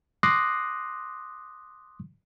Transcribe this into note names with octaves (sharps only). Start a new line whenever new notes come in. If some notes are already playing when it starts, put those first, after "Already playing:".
C6 D6 D#6 F#6 A#6 C7